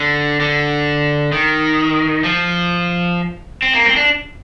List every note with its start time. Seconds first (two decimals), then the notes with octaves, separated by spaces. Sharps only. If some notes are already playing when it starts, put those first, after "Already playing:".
Already playing: D3
0.40 D3
1.32 D#3
2.24 F3
3.62 C4
3.74 A#3
3.85 C4
3.96 D4